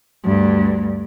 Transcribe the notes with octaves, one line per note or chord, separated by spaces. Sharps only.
D2 G2